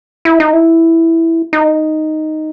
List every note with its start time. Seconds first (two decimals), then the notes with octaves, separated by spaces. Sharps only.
0.25 E4
0.40 D#4
0.53 E4
1.53 D#4